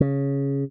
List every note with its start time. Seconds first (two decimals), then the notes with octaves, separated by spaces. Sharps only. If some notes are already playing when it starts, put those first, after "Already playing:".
0.01 C#3